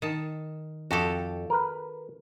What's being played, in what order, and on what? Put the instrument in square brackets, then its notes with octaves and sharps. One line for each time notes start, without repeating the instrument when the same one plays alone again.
[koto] D#3 A5
[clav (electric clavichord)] F2 [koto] F#4 G4 A4
[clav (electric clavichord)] A#4 B4